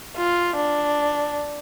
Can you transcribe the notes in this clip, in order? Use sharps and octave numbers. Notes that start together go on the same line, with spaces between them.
F4
D4